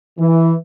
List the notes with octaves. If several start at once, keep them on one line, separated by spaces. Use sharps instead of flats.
E3